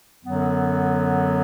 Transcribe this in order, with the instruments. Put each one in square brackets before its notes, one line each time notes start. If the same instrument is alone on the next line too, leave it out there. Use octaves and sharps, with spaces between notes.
[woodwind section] F#2 D3 F#3 B3